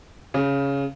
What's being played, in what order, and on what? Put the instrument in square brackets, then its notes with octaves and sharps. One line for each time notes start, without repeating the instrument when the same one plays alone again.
[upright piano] C#3